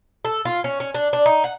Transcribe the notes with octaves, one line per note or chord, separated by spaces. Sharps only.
A4
F4
C#4
C#4
D4
D4
D#4
F#5